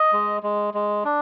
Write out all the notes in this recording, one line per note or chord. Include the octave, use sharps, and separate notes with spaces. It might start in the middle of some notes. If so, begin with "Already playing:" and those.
Already playing: D#5
G#3
G#3
G#3
D4